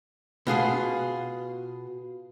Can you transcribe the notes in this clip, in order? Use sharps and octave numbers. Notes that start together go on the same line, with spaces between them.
B2 F4 G#4 F#5